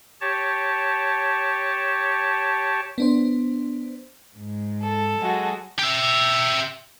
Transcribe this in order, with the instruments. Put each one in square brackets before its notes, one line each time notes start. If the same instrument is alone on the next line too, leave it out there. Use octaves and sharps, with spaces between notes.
[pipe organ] G4 C#5 A5
[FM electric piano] B3 D4 C5
[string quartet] G#2
[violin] A4
[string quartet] F#3 G#3 F#4
[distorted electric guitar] G4 E5